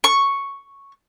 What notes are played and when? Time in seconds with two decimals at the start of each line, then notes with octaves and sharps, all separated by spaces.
0.04 C#6